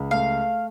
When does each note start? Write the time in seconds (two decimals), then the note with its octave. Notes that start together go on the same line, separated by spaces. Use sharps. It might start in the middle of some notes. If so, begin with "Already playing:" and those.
Already playing: C#2
0.11 A3 F5